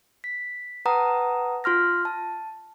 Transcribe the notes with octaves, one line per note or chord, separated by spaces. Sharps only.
B6
B4 F#5 G5 A5 A#5 D#6
F4 C6 F6 A#6
A5